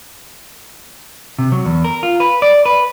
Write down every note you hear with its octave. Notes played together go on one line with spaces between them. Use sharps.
C3
F#3
E2
A#4
F4
B4
D5
B4